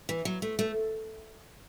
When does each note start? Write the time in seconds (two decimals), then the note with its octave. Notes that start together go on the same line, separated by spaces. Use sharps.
0.09 E3
0.25 F#3
0.42 A3
0.59 A3